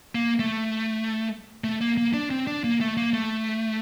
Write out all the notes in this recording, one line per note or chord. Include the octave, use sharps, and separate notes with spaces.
A#3
A3
A3
A#3
A#3
D4
C4
D4
A#3
A3
A#3
A3